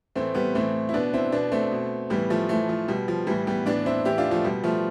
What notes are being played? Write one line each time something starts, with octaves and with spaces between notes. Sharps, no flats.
A2 E3 A3 C4
G3 B3
A2 E3 A3 C4
E4
B2 B3 D4
C4 E4
B2 B3 D4
A3 C4
B2
A2 E3 G3 B3
F3 A3
A2 E3 F3 A3
F3
B2 G3
F3
A2 E3 G3
G3 B3
A2 E3 B3 D4
C4 E4
A2 E3 E4 G4
D4 F4
F3 A3
B2 G3
F3 A3